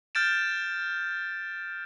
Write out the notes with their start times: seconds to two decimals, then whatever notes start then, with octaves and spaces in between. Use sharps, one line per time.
0.15 F6 G6 A6 D7 E7